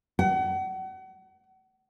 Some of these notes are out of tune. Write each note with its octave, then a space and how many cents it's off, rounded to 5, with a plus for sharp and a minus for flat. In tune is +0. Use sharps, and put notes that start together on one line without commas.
F#5 +35